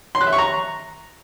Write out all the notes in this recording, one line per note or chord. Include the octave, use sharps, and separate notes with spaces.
C6
F#6
E5
C#6
A#5